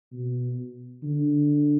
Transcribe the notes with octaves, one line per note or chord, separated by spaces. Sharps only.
B2
D3